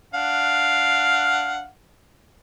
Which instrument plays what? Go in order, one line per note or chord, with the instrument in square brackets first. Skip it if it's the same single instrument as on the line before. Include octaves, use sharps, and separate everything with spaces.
[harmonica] D4 F5 F#5